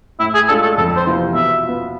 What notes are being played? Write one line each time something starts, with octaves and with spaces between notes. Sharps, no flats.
A2 E4
G#4
G#3 D4 F4 A4
A4
F2 A4
C5
C3 E3 B3 F4
B2 E5
F4
B3